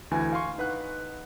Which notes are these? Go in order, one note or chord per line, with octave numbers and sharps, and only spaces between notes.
D2 E3 G#5
F5 G#5 C6 C#6
D#4 B4 F#5 F#6